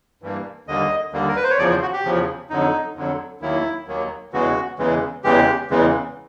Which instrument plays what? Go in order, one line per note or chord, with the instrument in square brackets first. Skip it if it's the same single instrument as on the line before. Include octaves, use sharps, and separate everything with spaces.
[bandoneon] G2 E3 G3 A#3
D#2 D3 G3 A#3 D#5
D#2 D3 G3 A#3
A#4
B4
C5
C#5
E2 C#3 F3 D5
C5
F#4
G4
E2 C#3 F3
F2 D3 F#3 D#4
F2 D3 F#3
D#2 D#3 F#3 A#3 E4
D#2 D#3 F#3 A#3
E2 C#3 E3 G#3 F#4
E2 C#3 E3 G#3
E2 C#3 E3 G#3 G4
E2 C#3 E3 G#3